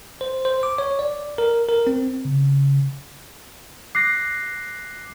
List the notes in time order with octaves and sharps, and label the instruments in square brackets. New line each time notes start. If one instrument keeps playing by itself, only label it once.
[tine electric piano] C5
C5
D6
C#5
D5
A#4
A#4
C4
[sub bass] C#3
[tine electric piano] D6 F#6 A#6 [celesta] C7